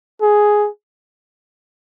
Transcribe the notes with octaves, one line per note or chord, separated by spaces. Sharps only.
G#4